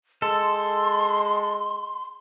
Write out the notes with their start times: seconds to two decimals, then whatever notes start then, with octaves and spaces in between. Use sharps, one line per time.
0.22 G#3 A4 C6